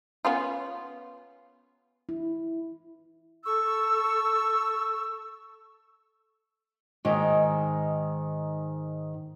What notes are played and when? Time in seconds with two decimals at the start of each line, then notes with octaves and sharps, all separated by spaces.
0.25 B3 C#4 F4
2.09 E4
3.44 A4 C#6 E6
7.05 G#2 D#3